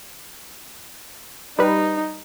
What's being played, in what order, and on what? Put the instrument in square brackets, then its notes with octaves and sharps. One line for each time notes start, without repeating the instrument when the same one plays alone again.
[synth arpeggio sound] G3 B4 [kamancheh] D#4